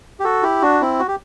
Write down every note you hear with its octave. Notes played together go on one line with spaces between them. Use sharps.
G4
F#4 A4
E4 G4
D4 F#4
C4 E4
F#4
G4